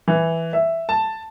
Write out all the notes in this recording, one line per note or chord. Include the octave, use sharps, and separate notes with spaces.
E3
E5
A5